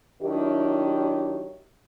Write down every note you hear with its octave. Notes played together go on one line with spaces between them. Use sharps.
D#3 F#3 D4 E4 G4